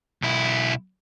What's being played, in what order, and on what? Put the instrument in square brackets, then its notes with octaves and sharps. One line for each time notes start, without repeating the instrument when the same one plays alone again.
[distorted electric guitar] B1 E4